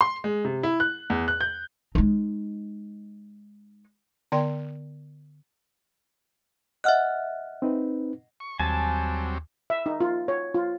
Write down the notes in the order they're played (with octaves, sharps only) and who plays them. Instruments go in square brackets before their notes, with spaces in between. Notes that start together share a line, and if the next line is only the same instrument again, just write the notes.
[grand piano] C6
G#3
C3
E4
F#6
E2
F#6
G6
[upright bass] G#3 D#4
[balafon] D3 B3 D5 G5 C6
[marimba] D#5 F#5 [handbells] E5 F6 F#6
[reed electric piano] C4 D#4 B4
[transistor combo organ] C#6
[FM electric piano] D#2 [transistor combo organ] F#3 G3 C4 [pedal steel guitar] G#5 A5
[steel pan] E5
D#4
F4
C#5
F4